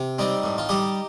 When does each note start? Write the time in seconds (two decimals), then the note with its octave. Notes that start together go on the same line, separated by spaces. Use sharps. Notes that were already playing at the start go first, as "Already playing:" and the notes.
Already playing: C3
0.18 G3 C4 D#4
0.43 A2
0.58 F4
0.69 G3 D#4 G4